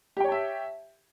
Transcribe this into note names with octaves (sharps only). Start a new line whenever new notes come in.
G4 C#5 E5 G5 A5